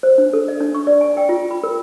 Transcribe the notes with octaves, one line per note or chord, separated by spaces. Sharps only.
C5
D4
A4
D#5
D4
C#6
D5
G#5
G5
F4
B5
A#4